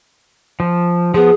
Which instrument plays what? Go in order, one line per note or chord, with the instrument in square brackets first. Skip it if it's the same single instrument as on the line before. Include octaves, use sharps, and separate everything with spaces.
[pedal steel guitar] F3
[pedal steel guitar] F3 B3 [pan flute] G#4